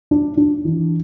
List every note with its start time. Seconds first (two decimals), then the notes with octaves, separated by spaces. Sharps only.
0.11 D4
0.37 D4
0.65 E3